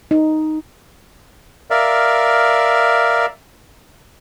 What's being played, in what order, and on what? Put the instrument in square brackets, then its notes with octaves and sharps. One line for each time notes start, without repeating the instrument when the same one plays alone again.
[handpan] D#4
[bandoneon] A#4 D5 E5 F5